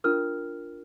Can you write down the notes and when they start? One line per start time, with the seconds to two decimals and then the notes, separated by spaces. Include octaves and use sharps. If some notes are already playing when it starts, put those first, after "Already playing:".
0.04 D4 F4 A#4 F6